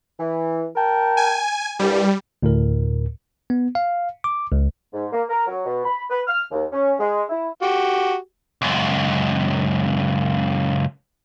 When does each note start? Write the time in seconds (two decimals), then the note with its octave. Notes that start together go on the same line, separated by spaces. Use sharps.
0.19 E3
0.76 A#4 G5 A5
1.17 G#5
1.79 C2 G2 G3
2.43 D2 A2 A#4
3.50 B3
3.75 F5
4.24 D6
4.52 C#2
4.93 G#2
5.12 A#3
5.28 A#4
5.47 F#3
5.66 B2
5.85 B5
6.09 B4
6.27 F6
6.52 D#2
6.72 C#4
6.98 G#3
7.29 E4
7.62 F#4 G4
8.62 C#2 F#2